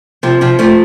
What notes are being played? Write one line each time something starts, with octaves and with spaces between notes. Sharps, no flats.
C3 F3
C3 F3
F3 A3